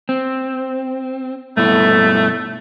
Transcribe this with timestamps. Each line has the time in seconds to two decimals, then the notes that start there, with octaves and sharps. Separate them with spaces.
0.09 C4
1.57 G2 B2 A3 E4